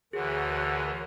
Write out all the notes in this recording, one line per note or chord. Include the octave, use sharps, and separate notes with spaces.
D2 D3 E3 F#4 G#4 A#4 C#5